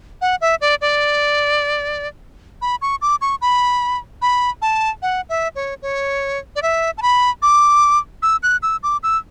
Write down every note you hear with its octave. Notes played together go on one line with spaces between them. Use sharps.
F#5
E5
D5
D5
B5
C#6
D6
C#6
B5
B5
A5
F#5
E5
C#5
C#5
D5
E5
A5
B5
D6
E6
F#6
E6
D6
E6